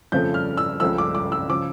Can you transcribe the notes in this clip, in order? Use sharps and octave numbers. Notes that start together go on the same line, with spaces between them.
F2 C#3 F3 A3 G6
F6
E6
C#2 C#3 F3 A3 E6
D6
D6
E6
C#3 F3 D6